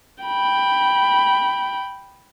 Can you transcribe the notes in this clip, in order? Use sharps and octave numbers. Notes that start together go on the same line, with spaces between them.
G5 B5